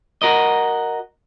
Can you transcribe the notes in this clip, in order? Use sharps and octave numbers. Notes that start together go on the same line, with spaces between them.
F#4 A#4 D#5